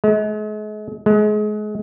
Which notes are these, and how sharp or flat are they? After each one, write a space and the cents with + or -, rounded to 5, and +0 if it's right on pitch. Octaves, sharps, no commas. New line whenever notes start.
G#3 +40
G#3 +30